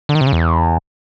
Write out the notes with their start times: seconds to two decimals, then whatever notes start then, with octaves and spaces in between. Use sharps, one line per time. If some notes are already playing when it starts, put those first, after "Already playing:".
0.09 D3
0.15 D#3
0.21 C3
0.27 C#3
0.33 E2